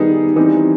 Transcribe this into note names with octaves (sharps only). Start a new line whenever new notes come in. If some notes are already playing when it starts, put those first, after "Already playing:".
Already playing: D#3 G3 B3 D#4 G#4
E3 G3 C4 D#4